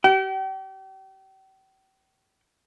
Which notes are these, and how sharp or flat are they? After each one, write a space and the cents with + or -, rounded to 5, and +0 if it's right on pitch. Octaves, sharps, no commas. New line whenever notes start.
G4 -35 G5 -40